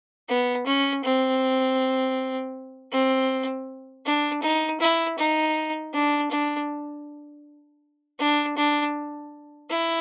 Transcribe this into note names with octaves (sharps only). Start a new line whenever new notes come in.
B3
C#4
C4
C4
D4
D#4
E4
D#4
D4
D4
D4
D4
E4